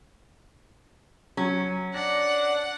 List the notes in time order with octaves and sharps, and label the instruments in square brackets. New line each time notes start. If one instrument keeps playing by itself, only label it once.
[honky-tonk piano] F#3 [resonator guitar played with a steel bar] C#4
[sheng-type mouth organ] D4 D5 [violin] F#5 [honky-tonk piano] A#6